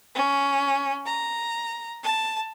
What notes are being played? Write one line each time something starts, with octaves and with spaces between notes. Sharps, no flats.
C#4
A#5
A5